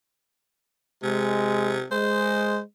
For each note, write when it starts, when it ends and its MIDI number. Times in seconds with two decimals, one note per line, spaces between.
1.03 1.86 48
1.03 1.75 56
1.91 2.60 56
1.91 2.58 72